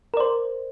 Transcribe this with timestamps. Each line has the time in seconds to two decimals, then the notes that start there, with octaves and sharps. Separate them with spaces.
0.14 A#4
0.17 D5
0.20 C5